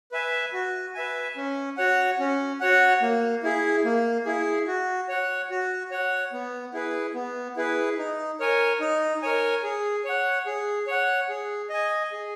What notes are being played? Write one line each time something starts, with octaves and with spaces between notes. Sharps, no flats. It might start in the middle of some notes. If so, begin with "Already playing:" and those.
B4 E5 G#5
F#4
B4 E5 G#5
C#4
F#4 C#5 F#5
C#4
F#4 C#5 F#5
A#3
E4 G#4
A#3
E4 G#4
F#4
C#5 F#5
F#4
C#5 F#5
B3
E4 G#4 B4
B3
E4 G#4 B4
D#4
A#4 C#5 G#5
D#4
A#4 C#5 G#5
G#4
C#5 F#5
G#4
C#5 F#5
G#4
D#5 G#5
G#4